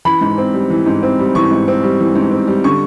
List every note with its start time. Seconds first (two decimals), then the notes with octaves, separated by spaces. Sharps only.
0.05 E3 B5
0.21 G#2
0.38 C4
0.54 G3
0.70 E3
0.86 G#2
1.03 C4
1.19 G3
1.35 E3 C#6
1.51 G#2
1.68 C4
1.83 G3
2.00 E3
2.15 G#2
2.31 C4
2.47 G3
2.64 D3 C#6